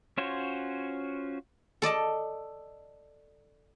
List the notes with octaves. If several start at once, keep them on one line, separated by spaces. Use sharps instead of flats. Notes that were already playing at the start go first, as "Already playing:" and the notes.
C#4 F4 F#4 C5 C#5
A4 D5 D#5 A5